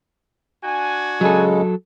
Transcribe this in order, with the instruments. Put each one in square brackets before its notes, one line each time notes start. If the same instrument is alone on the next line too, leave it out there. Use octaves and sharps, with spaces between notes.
[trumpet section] D4 F#4 G#5
[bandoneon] C#3 G#3 [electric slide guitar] F#3 A4